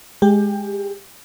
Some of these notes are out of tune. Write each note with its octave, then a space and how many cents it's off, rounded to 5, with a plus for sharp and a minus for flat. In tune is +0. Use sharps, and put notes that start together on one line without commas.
G#3 +0 G4 +20